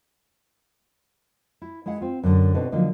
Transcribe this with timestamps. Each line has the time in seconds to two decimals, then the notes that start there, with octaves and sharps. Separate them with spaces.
1.62 E4
1.86 G#3 E4 G#4 F#5
2.00 C4 F4
2.23 F#2 D3
2.54 B2 C4 D4 D#4 G4 A4
2.72 D3 F3 F#3 A#3 D#4